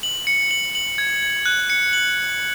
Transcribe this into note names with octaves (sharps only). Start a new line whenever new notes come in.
F#7
C#7
F#7
F#7
G#6
G#6
F#6
C#7
F#7